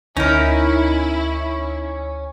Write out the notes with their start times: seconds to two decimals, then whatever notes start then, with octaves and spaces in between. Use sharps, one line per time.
0.17 D2 C#4 D#4 E4 A#4